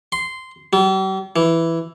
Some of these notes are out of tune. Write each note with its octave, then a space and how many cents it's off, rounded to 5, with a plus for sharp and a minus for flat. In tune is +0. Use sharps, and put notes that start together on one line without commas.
C6 -10
G3 -45
E3 +5